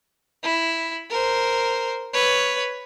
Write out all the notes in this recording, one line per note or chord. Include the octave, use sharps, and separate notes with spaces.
E4
A#4 C5
B4 C#5